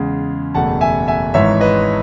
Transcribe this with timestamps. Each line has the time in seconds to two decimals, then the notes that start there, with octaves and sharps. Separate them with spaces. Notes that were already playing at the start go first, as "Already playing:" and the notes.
Already playing: E2 C#3 G#3
0.54 F#1 E2 B2 A3 F#5 A5
0.81 E5 G#5
1.08 E5 G#5
1.34 G#1 G#2 E3 G#3 C#5 E5
1.61 B4 D#5